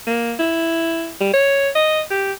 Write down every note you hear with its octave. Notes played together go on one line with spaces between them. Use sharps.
A#3
E4
G3
C#5
D#5
G4